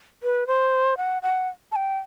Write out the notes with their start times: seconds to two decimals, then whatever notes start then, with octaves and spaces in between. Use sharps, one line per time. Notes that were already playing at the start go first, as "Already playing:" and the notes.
0.23 B4
0.47 C5
0.97 F#5
1.22 F#5
1.72 A5
1.76 G5